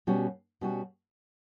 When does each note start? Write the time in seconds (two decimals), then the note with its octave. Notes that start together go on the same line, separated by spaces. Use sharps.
0.07 B2 G3 C#4 F#4
0.61 B2 G3 C#4 F#4